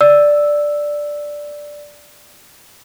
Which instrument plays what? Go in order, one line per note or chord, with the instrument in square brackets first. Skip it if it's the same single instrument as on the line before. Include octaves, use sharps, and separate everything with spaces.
[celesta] D5 E6